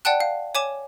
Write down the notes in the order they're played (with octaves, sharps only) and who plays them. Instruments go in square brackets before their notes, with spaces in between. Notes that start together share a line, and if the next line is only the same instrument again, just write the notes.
[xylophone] D5 F#5 G5 A5 F#6
F5
C#5 G#5 D6 E7